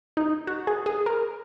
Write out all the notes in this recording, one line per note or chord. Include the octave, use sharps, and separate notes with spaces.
D#4
F#4
G#4
G#4
A#4